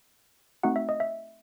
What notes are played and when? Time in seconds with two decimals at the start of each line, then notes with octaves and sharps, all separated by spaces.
0.63 A3 C4 D#4 F#4 F#5
0.76 E5
0.89 D#5
1.00 E5